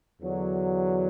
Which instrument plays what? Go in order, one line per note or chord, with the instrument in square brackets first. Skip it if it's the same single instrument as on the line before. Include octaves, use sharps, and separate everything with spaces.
[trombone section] E2 D3 F#3 D4